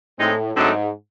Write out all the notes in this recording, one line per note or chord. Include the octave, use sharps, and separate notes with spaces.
A2 G#3 C4 D#4
G#2 D3 F#3 A3 C4 D#4